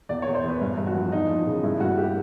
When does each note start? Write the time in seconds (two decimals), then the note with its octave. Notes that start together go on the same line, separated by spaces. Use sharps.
0.09 E2 D5
0.22 E2 C#5
0.35 C5
0.44 E2 B4
0.61 G2
0.78 G2
0.87 F#4
0.95 F3
1.12 E2 D#4
1.29 F3
1.47 C#3
1.64 G2 E4
1.80 G2 F#4
1.98 G4